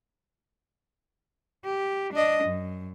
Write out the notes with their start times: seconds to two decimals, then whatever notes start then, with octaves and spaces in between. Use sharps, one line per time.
1.65 G4
2.14 D4 D#5
2.44 F#2